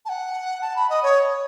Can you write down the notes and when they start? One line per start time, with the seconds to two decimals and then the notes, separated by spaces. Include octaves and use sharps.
0.05 A5
0.09 F#5
0.61 A5
0.76 B5
0.90 D#5
1.03 C#5